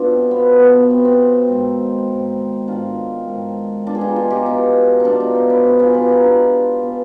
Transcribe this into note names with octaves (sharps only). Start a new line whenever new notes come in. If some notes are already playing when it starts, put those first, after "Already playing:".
Already playing: B2 D4 F4
C4
B2 B3
B3
B3
B2 C4
C4
G#2 D#3
G#2 D#3
G#2 D#3 D4 F4
G#2 D#3
B2 D4 F4
G#4
D#4 G4
F4 G#4
D#4 G4
B2 D#4 G4
D#4
B2 D4 F4
D#4 G4
C5 D#5
B4 D5
B2 G4 B4
F4 G#4
G4 B4
D#4 G4
B2 D4 F4
B2